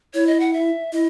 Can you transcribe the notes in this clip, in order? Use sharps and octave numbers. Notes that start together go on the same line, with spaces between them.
E4 C#5
D#5
F#5
E5
E4 D#5